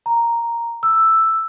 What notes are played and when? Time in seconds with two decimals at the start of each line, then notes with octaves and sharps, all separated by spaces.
0.06 A#5
0.83 E6